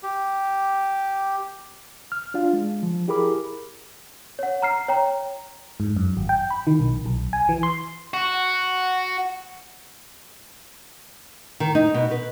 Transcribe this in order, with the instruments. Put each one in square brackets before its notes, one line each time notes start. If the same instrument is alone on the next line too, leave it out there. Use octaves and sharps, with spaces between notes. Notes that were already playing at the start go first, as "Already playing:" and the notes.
[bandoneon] G4
[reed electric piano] F6
D4 F4 F5
G#3
F3
E4 G4 G#4 A#4 B5 D6
[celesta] C#5 F#5
A#5 F6 C7
C#5 G5 A#5
[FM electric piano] G#2
F#2
G#1
G5
B5
D#3
B1
B1
G#5
E3
C6
[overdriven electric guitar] F#4
[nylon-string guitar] D#3
D#4
B2
B4